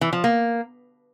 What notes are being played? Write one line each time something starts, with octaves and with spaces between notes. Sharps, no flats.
E3
F3
A#3